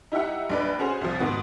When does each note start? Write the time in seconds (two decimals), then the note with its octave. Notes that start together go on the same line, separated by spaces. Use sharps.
0.12 D#4 E4 G4 E5 F#5
0.50 A#1 D4 B4
0.79 C#4 F#4 G#4 C5
1.01 C2 F3
1.19 G#2 D#3 B3 F#4